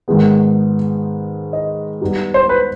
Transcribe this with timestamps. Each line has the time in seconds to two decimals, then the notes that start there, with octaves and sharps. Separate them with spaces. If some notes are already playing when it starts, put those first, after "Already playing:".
0.08 G#2 D#3 G#3 B3
1.53 D#5
2.01 G3 B3 D#4 G4
2.34 C5
2.49 B4